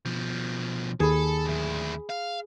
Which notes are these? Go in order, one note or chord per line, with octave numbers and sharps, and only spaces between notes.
B2 F3
D#2 G#4 A4 B5
D2 E4
F5